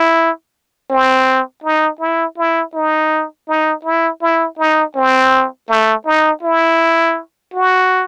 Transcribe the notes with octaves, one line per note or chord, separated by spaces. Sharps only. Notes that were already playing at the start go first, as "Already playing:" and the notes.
Already playing: E4
C4
D#4
E4
E4
D#4
D#4
E4
E4
D#4
C4
A3
D#4
E4
F#4